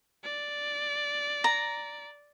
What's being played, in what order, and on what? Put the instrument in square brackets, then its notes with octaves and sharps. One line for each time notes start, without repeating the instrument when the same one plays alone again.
[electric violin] D5
[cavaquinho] A#5